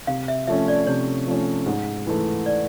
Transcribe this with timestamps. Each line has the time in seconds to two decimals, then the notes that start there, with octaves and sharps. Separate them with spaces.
0.07 C3 F5
0.28 E5
0.48 F3 A3 C#4 E5
0.68 D5
0.87 C3 C#5
1.27 F3 A3 C#4
1.66 G#2
2.07 E3 A3
2.46 D5